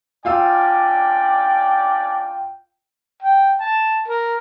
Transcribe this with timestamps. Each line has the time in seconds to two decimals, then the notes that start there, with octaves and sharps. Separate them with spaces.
0.25 C#4 D4 F4 D5 F5 G5 E6
3.23 G5
3.60 A5
4.08 A#4